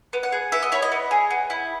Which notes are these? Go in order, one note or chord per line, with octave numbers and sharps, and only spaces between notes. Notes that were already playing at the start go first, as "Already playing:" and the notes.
B3
F#5
G#4
B3 E5
D#5
E4 C#5
D#5
B3
G#4
B3
E4